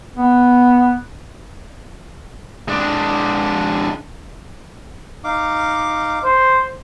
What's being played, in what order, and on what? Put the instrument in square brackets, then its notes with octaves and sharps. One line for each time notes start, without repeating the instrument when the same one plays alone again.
[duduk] B3
[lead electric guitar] G#3 D4
[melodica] D#4 F5 D6
[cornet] C5